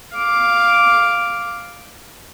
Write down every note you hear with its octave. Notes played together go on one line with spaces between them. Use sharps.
F5 D6